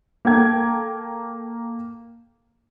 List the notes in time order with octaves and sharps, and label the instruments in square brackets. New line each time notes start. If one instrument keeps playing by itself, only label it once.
[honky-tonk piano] A#3 A4 G5 G#6